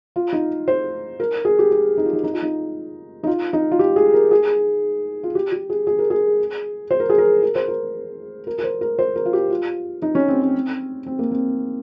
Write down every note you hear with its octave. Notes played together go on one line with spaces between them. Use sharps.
F4
D#4
C5
A#4
G#4
G4
G4
D#4
F4
D#4
D#4
F4
D#4
D#4
F4
D#4
F4
G4
G#4
A#4
G#4
F4
G4
G4
G#4
G#4
A#4
G#4
C5
A#4
G#4
A#4
A#4
C5
A#4
A#4
A#4
C5
A#4
C5
A#4
F4
G4
F4
D#4
C#4
C4
C4
C4
A#3
C4